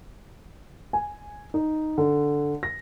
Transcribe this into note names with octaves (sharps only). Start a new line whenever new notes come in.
G#5
D#4
D3
A#6